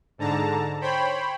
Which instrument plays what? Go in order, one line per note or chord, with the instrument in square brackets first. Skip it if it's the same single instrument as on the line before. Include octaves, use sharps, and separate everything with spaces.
[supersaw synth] G#2 D3 A5 A#5
C5 C#5 G5 B5